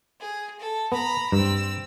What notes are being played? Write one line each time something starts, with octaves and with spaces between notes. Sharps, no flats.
G#4
A4
B3 A#5 B5
G2 C4 E6